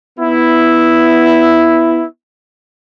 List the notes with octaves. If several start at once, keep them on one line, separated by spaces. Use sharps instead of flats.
B3 E4